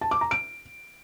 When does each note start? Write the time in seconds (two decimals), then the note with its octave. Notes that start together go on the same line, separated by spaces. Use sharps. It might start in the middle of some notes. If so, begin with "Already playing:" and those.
0.01 A5
0.11 D6
0.21 A#5
0.31 D7